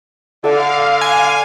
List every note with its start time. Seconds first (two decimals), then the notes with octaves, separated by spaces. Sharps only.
0.44 D3 A4 E5 F5
1.01 G#5